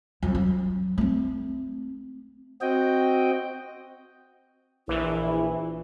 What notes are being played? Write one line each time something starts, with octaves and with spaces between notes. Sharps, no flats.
F2 F#3
F#3
A3 C4
C4 F#4 D#5 G5
A#1 E3 E4